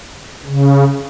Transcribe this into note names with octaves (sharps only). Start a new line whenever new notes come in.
C#3